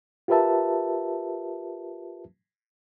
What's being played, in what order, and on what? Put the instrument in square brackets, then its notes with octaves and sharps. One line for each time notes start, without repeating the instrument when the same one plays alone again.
[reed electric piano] F4 G4 A#4 B4 E5 A5